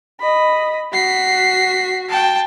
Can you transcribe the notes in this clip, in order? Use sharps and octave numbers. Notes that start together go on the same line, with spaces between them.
D#5 B5
F#4 B6 C7
G5 A5